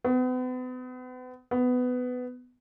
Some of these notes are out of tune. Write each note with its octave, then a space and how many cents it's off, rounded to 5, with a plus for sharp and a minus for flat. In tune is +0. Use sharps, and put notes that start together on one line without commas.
B3 +40
B3 +15